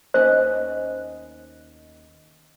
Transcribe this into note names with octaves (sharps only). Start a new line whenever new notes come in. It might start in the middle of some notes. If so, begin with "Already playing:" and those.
D#2 C#4 C5 D#5